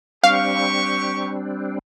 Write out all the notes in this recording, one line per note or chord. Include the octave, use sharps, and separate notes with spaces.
G3 C4 D4 G4 F5 C#6